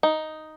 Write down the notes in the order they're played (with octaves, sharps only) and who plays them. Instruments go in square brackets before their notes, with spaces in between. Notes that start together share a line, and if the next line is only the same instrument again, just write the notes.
[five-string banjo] D#4